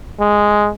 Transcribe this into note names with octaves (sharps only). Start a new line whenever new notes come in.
G#3